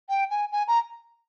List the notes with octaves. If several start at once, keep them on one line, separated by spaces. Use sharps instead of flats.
G5
G#5
G#5
A#5